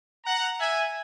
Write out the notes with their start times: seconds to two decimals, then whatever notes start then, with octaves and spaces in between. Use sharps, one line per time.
0.24 F#5 A#5
0.59 E5 G#5